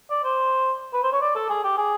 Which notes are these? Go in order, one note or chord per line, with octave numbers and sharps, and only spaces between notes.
D5
C5
B4
C5
C#5
D5
A4
G#4
G4
G#4